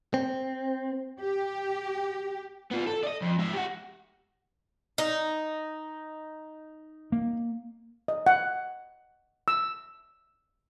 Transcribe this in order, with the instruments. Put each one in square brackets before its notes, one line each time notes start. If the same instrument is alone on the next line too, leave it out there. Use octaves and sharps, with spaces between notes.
[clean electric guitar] C4
[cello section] G4
[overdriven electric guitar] B3 F4
A4
D5 D#5
F2
G#2 E5
G4 F#5
[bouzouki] D#4
[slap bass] A#3
[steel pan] D#5
F#5
E6